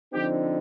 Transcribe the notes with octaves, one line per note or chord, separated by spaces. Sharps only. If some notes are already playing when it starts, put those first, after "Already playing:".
D3 F3 C4 D#4 G4